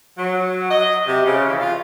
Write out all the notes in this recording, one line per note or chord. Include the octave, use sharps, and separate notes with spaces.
F#3
D#5
C3
C#3
E3
F4